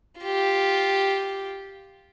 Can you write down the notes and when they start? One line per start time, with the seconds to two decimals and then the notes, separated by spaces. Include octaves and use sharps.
0.21 F4 G4